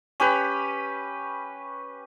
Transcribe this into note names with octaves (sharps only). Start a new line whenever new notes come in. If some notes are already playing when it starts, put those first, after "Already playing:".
C#4 G4 B4